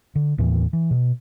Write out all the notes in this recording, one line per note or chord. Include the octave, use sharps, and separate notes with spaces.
D3
D#2 A2 E3
E3
B2